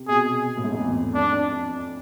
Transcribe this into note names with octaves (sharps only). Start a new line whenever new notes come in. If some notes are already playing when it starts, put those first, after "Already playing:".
Already playing: C3
B2 G#4
A2
G#2
F2
E2
F2 D4
F2